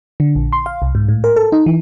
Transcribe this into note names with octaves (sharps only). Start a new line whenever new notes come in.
D3
A#1
C6
F5
C2
G#2
A2
A#4
A4
D#4
E3